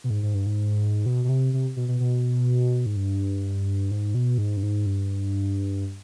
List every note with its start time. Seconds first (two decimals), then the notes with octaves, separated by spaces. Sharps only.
0.04 B2
0.10 G#2
0.23 G#2
0.34 G2
0.46 G#2
1.06 B2
1.24 B2
1.29 C3
1.53 C3
1.76 B2
1.88 B2
2.00 B2
2.86 G#2
2.96 G2
3.91 G#2
4.14 B2
4.38 G#2
4.57 G2
4.63 G#2
4.86 G2